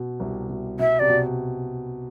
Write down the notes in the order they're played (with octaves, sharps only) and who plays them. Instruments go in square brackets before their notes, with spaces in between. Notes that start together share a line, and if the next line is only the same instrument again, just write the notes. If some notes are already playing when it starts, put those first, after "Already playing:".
Already playing: [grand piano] B2
C2 C3
B2
[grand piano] B2 [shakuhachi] E5
[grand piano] C3 [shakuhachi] D5
[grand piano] B2